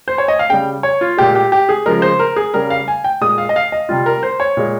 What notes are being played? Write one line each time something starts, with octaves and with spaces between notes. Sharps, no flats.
C5
C#5
D#5
F5
C#3 G3 G5
C#5
F4
A#2 G#3 G4
G4
G4
G#4
C#3 F3 G#3 A#4
C5
A#4
G#4
C#3 G3 A#4
F5
G#5
G5
A#2 G#3 D#6
F5
D#5
F5
D#5
C3 G3 F4
A#4
C5
C#5
A#2 G#3